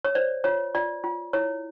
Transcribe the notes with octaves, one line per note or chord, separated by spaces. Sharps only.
C#5
C5 D5
F4 C#5
F4 D5
F4
E4 C#5